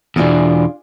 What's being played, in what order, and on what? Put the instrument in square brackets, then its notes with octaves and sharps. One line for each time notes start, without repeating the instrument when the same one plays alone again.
[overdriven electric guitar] E2 B2 [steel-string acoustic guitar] D4 F4 G#4